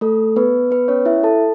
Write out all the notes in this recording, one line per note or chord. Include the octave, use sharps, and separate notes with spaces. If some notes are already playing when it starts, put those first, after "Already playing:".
A3 A4
B3 B4
B3 B4
C#4 C#5
E4 E5
A4 A5